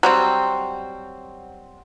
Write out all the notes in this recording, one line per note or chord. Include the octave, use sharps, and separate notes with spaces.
F#3 G3 C4